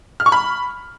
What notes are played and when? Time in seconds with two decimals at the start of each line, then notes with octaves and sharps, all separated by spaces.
0.20 F6
0.26 C#6
0.32 B5